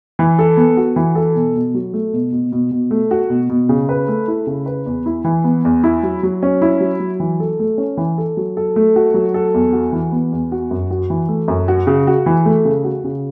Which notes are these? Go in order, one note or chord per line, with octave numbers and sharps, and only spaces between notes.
E3
A4
B3
F#4
E3
A4
B2
B2
F#3
A3
B2
B2
B2
B2
A3
F#4
B2
B2
C#3
B4
A3
E4
C#3
B4
E2
E4
E3
B3
E2
E4
F#3
F#3
C#4
E4
F#3
F#3
E3
A4
A3
C#4
E3
A4
F#3
A4
A3
F#4
F#3
A4
E2
F#4
E3
B3
E2
F#4
F#2
F#4
E3
A3
F#2
F#4
C#3
F#4
E3
A3
C#3
F#4
C#3